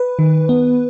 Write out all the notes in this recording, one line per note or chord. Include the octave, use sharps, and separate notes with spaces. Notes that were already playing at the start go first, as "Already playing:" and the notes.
Already playing: B4
D#3
B3